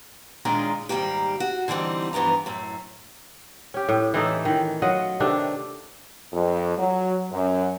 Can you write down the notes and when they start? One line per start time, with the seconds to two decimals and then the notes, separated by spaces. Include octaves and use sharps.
0.45 A#2 D#3 G#3 C#4 D4 F4
0.89 G#2 D#3 G3 G#3 A#3 G4
1.40 F#4
1.68 D3 E3 G3 C4 D#4
2.13 G2 E3 F3 B3 A#5
2.46 F#2 A2
3.74 C#4 G4
3.89 A2
4.14 E3 A3 D#4 A4
4.45 D#3 E3
4.82 F#3 F4 D#5 F#5
5.20 C3 D#3 A3 D4
6.33 F2
6.77 F#3
7.31 F#2